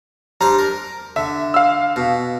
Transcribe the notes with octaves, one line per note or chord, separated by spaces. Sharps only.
G3 D4 C5 A#5
A#4
D3 E5
F5 E6
B2